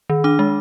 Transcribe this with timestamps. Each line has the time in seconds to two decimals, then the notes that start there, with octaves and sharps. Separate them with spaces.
0.10 D#3
0.24 D4 D6
0.39 G#3